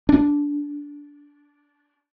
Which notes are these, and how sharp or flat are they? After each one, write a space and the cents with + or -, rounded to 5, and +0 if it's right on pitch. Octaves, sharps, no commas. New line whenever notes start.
D4 -15